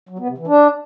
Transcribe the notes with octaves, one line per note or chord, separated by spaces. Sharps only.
F#3
B3
C3
E3
D4